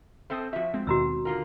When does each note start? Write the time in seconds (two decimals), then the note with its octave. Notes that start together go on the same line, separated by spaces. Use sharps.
0.30 C4 A4 C5 E5 A5 D#6
0.53 F3 F4 F#4 E5
0.74 G#3 C4
0.87 D#2 B2 D#3 F#4 A#5 E6
1.25 D3 F4 A#4